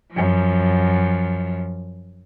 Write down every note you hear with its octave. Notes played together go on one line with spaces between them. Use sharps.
F#2 F3